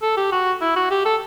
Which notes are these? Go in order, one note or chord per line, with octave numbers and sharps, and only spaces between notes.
A4
G4
F#4
E4
F#4
G4
A4